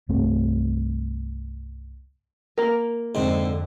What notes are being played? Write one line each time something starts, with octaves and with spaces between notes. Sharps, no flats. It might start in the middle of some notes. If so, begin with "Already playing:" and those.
C2 G2 A3 C4
A#3 A#4
F2 G#2 D3 C4